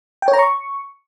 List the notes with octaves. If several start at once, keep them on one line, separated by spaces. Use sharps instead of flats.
G5
C#5
A#5
C#6